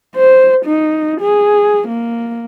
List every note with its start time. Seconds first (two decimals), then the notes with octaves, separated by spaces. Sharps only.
0.16 C5
0.65 D#4
1.21 G#4
1.88 A#3